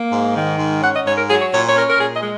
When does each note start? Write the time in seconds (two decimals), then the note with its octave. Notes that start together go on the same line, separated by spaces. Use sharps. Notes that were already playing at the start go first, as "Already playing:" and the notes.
Already playing: A#3
0.12 G#2
0.35 D#3
0.58 G#2
0.82 C#4 F#5
0.94 D#5
1.05 G#2 C#5
1.17 A#4
1.29 F#3 G#4
1.40 C#5
1.52 A#2 C#5
1.68 C#5
1.75 C#4 A#4
1.89 A#4
1.99 A#2 G#4
2.14 D#5
2.22 G#3